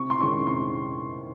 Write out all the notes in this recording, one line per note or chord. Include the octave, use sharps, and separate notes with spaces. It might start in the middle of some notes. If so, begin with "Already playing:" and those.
Already playing: C3 C#6
C6
D#3 G#3 C#4 C#6
C3 C6